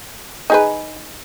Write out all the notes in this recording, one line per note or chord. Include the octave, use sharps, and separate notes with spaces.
D#4 G#4 B4